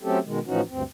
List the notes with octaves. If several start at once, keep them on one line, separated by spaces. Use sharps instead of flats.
F#3 A3 C4 C#4 G4 A4
B2 D#3 G#3
A2 E3 F3 C#4 D#4 F#4
D2 G2 C4